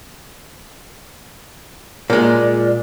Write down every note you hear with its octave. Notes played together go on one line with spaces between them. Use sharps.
A#2 G#3 D5